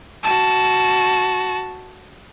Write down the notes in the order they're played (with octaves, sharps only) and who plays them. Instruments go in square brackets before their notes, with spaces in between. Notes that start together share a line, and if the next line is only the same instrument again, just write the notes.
[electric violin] F#4 A5